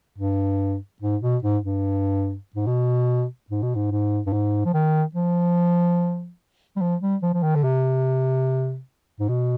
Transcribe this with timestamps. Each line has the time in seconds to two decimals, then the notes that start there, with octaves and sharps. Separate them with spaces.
0.18 G2
1.02 G#2
1.22 B2
1.43 G#2
1.63 G2
2.55 G#2
2.67 B2
3.50 G#2
3.62 B2
3.75 G#2
3.91 G#2
4.26 G2
4.32 G#2
4.65 F3
4.74 D#3
5.15 F3
6.76 G3
6.81 F3
7.01 G3
7.23 F3
7.34 F3
7.43 D#3
7.56 D3
7.64 C3
9.20 G#2
9.29 B2